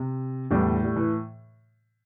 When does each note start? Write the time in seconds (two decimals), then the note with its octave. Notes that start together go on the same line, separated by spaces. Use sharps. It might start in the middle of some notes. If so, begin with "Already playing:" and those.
Already playing: C3
0.51 E2 A2 D3 G3 D4
0.84 G3
0.96 E3